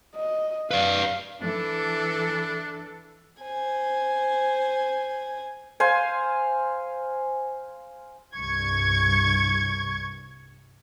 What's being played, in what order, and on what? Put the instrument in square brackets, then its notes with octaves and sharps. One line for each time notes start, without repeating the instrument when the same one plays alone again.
[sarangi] D#5
[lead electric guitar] B4 D5 [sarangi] F5
[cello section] E3 A4 [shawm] D4
[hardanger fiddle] C5 G#5
[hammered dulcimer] C5 F5 G#5
[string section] C2 G2 C#6 G#6